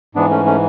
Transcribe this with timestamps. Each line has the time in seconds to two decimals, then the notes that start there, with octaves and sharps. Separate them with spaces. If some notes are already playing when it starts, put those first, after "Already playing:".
0.15 G#2 E3 B3 D4
0.30 A3 C#4
0.45 A3 C#4